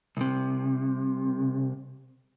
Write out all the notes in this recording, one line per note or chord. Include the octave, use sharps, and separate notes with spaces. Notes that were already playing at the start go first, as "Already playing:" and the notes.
C2 C3